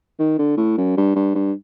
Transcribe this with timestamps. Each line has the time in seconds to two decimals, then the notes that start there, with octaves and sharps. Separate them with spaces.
0.19 D#3
0.39 D3
0.57 A2
0.78 F#2
0.97 G2
1.15 G2
1.35 G2